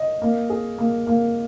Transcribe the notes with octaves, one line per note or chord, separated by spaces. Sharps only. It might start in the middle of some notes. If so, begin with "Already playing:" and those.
Already playing: D#5
A#3
G#4
A#3
A#3